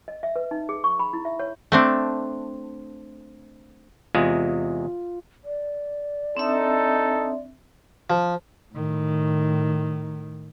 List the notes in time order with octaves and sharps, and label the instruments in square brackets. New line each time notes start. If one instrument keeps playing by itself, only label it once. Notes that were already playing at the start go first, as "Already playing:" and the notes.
[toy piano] D#5
E5
B4
D#4
G#4
C#6
B5
E4
E5
C#5
[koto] A3 C4 D4
[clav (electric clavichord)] E2 C3 G#3 [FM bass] F4
[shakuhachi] D5
[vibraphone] C4 D4 E5 [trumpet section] D#4 A4
[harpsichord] F3
[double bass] A2 D#3